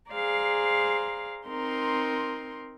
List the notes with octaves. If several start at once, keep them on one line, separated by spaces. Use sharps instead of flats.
G#4 C5 D5 F5 A#5
C4 D#4 A#4 C6